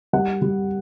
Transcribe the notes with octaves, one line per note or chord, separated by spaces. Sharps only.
G3 F#5
G3